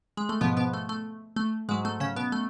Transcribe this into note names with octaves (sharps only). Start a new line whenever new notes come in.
G#3
A3
G#2 B2 F3 B3
B2 B3
A3
A3
A3
G#2 F#3 G#3
A3
C#3 C#4
B2 B3
A3